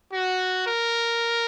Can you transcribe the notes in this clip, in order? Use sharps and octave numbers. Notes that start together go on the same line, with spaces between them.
F#4
A#4